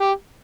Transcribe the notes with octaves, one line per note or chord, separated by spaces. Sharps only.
G4